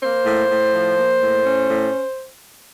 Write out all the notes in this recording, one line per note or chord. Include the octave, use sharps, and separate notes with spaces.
A#3 C5
A2
A2
F3
A#3
A2
C#4
A2